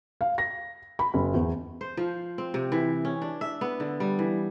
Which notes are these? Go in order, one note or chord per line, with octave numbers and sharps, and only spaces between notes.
F5
A#6
B5
F#1
E2
C5
F3
C4
C3
E3
C#4
D4
E5
B3
D3
G3
E3